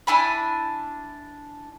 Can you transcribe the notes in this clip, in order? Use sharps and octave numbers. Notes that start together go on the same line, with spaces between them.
D4 E4 G#5 B5